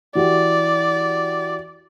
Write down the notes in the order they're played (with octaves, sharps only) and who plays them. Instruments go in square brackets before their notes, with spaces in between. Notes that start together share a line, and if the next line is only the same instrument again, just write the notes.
[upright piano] E3 F#4 G4 [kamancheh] D5